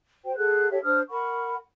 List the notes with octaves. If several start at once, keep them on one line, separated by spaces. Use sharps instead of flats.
F#4 C5 G5
G#4 A4 F#5 F#6
G4 A4 C#5 E5
D4 C5 D#6 F6
A#4 F#5 B5 C#6